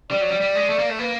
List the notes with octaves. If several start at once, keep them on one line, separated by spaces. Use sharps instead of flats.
G3 D5
F#3
G3
G3
G#3
A3
A#3
A3
A#3 B4